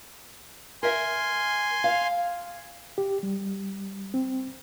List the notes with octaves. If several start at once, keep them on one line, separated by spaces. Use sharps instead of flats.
A#4 E5 G#5 C6
F5
G4
G3
C4